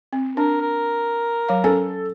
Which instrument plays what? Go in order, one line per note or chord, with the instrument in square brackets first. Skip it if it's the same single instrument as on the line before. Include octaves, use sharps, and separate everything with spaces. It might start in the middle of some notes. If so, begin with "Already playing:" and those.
[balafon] C4
[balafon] D4 [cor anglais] A#4
[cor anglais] A#4
[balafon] F#3 F5
[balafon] C#4 G#5 [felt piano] A4